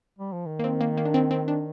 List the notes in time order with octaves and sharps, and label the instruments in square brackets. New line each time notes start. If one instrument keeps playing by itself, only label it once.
[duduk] G3
F3
D#3
[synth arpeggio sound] A#3
C4
A#3
A#3
D4
C4
C4
D4